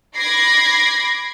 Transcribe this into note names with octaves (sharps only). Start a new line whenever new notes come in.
B5 D6 G#6 A#6 C7